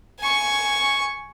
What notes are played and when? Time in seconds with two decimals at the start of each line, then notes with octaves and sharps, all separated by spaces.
0.20 G#5 C#6